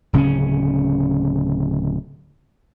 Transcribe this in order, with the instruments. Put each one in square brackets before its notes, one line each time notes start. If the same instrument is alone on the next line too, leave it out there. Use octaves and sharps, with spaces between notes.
[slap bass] D1 C#3 C4 C#4